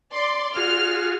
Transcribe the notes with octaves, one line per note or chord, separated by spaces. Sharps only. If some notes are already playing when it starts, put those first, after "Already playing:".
D5 C6
F4 F#4 G#4 F6